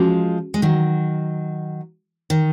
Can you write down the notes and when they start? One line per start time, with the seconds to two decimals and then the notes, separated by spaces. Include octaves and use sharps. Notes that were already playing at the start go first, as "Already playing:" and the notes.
Already playing: F3 G#3 C#4 F#4
0.54 G#3
0.62 D#3 F#3
2.30 D#3